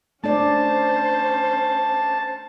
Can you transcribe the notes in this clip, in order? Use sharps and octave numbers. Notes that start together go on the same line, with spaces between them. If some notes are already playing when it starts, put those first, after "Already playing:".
A3 C#4 D4 C5 D5 A5